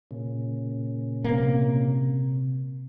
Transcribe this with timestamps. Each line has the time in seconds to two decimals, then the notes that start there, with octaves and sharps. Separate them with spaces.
0.11 A#2 C#3
1.24 C3 A#3